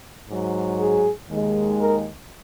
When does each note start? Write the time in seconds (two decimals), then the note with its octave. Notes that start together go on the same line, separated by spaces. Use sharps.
0.29 G#2 F#3
0.79 G#4
1.29 D#2 D#3 G#3
1.79 A#4